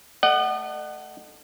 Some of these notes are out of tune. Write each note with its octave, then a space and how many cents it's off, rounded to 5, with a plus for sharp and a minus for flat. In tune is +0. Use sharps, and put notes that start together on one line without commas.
A3 +0 D#5 -40 F#5 +15